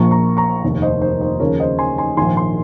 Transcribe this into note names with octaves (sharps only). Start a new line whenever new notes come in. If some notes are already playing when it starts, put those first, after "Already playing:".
Already playing: A#1 A#2 F3 A#5 C#6
A#5 C#6
A#5 C#6
F1 D#2 D#3
C5 D#5
C5
C5
D#2 C#3 F3 A#4 C#5
C5 D#5
G#5 C6
G#5 C6
A#1 G#2 D#3 G#5 C6
G#5 C6